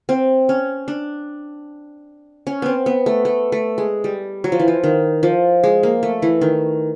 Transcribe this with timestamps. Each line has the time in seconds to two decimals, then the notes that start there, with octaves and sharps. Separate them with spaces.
0.09 C4
0.49 C#4
0.88 D4
2.47 C#4
2.62 B3 C4
2.86 B3
3.06 A3
3.25 A3
3.52 A3
3.78 G#3
4.04 G3
4.44 F#3
4.52 F3
4.59 E3
4.68 F3
4.83 D#3
5.23 F3
5.64 G#3
5.83 A#3
6.03 A3
6.22 E3
6.41 D#3